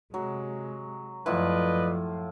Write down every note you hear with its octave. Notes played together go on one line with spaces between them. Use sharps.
C3 F#3 G#3
F#2 A2 F3 F4 B4 D5 D#5 F#5